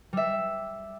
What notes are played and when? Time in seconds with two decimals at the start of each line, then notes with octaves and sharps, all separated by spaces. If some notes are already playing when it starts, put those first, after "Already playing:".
0.13 G3 E5